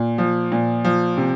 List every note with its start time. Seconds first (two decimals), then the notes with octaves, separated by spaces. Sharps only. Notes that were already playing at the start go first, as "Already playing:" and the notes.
Already playing: A#2
0.18 F3
0.52 A#2
0.84 F3
1.17 C3